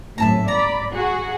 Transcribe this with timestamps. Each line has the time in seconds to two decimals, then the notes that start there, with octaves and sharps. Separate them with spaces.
0.18 G#1 F#2 A2 E5 A5 A#5
0.48 D5 A#5 B5
0.94 F#4 G#4 F#5